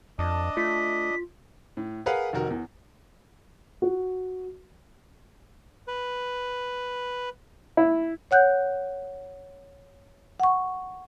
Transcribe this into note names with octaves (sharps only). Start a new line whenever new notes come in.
F2 D4 D#5 A5
A3 F4 B6
A2
G#4 A#4 B4 F5 F#5
F1 D#3 F#4 A#4
E2
F#4
B4
E4
C#5 F#5 F#6 G6
F#5 C#6